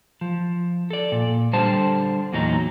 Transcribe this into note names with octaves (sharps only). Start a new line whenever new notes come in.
F3
A4 D5
A#2
D3 G3 C5 A5
E2 A#2 F#3 D#4